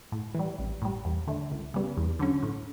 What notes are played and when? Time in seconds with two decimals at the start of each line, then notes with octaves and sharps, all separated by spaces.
0.12 A2
0.35 E3 G3
0.59 A1
0.82 A2 G3
1.05 E2
1.28 D3 A3
1.51 C#2
1.74 C#3 G3 B3
1.97 E2
2.20 D3 F#3 C#4
2.43 A2